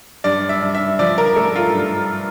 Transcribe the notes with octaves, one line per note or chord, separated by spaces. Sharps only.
G2 D5
E5
G2
E5
F3 D5
A#4
A3 A4
F4
G2